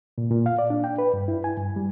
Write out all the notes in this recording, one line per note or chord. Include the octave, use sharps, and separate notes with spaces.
A#2
A#2
F5
D5
D4
G5
B4
G2
E4
G#5
G2
G3